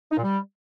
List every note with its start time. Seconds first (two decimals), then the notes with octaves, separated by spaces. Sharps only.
0.11 D#4
0.17 A#2
0.24 G3